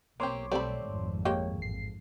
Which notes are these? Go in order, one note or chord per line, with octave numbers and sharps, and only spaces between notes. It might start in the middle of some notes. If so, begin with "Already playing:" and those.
B1 A#3 C4 G4 C#5 C6 D6
G3 A3 C4 D5 B5
G#1 F2
G#3 A#3 G4 C#5
A1 C7